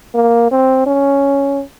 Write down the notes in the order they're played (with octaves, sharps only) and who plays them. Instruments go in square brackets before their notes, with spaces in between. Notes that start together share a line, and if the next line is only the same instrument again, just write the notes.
[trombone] A#3
C4
C#4